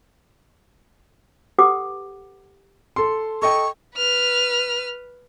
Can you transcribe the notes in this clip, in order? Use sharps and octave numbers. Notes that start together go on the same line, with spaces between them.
G4 A4 B4 F#5 D6
A4 C6
A4 D#5 G5 C#6
B4 F6